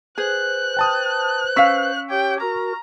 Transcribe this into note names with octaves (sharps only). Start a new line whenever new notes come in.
G#4 B4 C5 F#6
G5 A5 D#6
C#4 F5 C#6 E6 B6
G4 C#5 G5
F#4 A#4 A#5